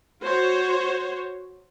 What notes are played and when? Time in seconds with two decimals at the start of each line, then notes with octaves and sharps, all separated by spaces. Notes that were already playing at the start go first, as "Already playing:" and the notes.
0.22 F#4 C5 C#5